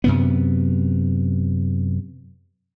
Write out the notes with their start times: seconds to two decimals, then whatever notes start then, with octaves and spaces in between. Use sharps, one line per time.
0.04 F#2 C3 B3